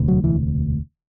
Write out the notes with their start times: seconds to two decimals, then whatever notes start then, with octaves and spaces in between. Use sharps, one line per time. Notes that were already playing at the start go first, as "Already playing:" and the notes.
Already playing: E1 D2 C3
0.08 F#3
0.24 E3